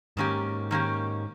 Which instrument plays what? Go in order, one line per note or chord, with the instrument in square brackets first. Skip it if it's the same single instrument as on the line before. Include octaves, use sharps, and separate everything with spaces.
[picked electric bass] G#2 [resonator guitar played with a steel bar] D#3 A#3 C#4 G4
[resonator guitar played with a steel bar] D#3 A#3 C#4 G4